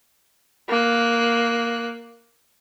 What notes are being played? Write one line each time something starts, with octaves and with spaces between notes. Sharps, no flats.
A#3 F#6